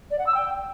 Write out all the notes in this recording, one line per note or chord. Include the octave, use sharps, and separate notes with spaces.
D5
F#5
E6
G5